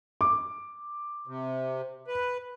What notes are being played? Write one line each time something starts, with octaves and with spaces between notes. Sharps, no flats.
D6
C3
B4